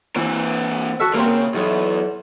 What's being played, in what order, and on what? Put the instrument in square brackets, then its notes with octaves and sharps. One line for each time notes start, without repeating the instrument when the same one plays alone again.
[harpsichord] E3 [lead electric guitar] A#3 C4
[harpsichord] F#4 A4 E5
[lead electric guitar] G3 A#4 [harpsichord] A#3 C4
[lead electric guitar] C#3
[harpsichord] B1 [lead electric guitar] E2